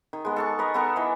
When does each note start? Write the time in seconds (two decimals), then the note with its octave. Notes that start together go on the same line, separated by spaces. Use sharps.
0.13 D#3
0.25 G#3 B3
0.36 A4 A5 C#6
0.59 A#4 B4 D#5
0.74 B3 A4 A#4
0.96 E3 D#5